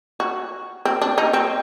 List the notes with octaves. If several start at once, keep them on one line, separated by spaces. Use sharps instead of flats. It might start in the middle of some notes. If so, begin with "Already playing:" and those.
F#4
C4
D4
D#4
C4